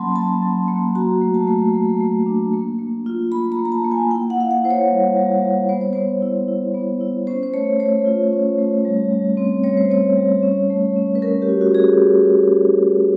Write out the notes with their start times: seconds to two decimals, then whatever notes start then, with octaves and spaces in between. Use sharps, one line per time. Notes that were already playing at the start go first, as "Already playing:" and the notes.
Already playing: F#3 A#3 C#4 A5 B5 C6
0.16 F#3 A5
0.42 F#3
0.68 A#3
0.95 F#4 A#5
1.21 A3
1.34 A5
1.48 A3
1.74 A3
2.00 A3
2.26 D4
2.53 A#3
2.79 A#3
3.06 F4
3.32 A#3 B5
3.52 A#5
3.59 A#3
3.65 A#5
3.72 A5
3.84 A#3
3.91 G#5
4.11 E4 G5
4.30 F#5
4.37 E4 F5
4.51 F#5
4.64 E4 C5
4.71 C#5
4.90 G3
5.17 G3
5.42 G3
5.69 B3 C5
5.81 C#5
5.93 B3 C5
6.22 E4
6.48 E4
6.74 B3
7.01 E4
7.27 C#4 C5
7.43 C5
7.54 A3 C#5
7.80 A3 C#5
8.06 F4
8.33 C#4
8.58 A3
8.85 G3
9.11 G3
9.37 C4
9.64 G3 C#5
9.77 C5
9.90 C4 C#5
10.17 G3
10.43 C#4
10.70 A3
10.96 C#4
11.15 B4
11.22 C#4 A#4
11.42 G4
11.49 F#4
11.61 F#4
11.75 C#4 G#4
11.81 G4